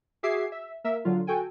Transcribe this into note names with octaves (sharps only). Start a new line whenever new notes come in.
F#4 G#4 E5 D6 G#6 C7
E5
A#3 A#4 E5
D3 F#3 F4
F#4 A4 G5 G#5